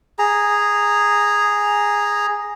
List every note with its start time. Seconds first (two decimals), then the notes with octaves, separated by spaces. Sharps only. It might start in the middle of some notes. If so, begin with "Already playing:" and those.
0.19 G#4 A#5